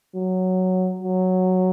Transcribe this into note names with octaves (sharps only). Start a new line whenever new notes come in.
F#3
F#3